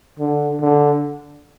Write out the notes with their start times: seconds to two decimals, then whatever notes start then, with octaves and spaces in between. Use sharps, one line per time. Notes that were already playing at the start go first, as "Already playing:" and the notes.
0.19 D3
0.61 D3